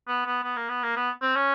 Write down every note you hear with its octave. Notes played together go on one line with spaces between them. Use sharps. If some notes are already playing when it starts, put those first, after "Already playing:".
B3
B3
B3
A#3
B3
A#3
B3
C4
C#4